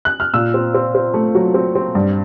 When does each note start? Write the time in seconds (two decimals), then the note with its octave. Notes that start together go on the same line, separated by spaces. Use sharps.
0.05 F#6
0.20 F6
0.34 A#2 E6
0.54 C4
0.74 C4
0.95 C4
1.14 A3
1.35 F#3
1.54 C4
1.75 C4
1.95 G2